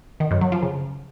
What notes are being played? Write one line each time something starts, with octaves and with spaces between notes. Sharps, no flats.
D#3
F#2
F#3
F3
C#3